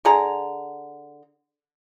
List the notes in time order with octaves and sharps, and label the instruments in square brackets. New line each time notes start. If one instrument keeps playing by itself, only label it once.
[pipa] D3 G#4 A#5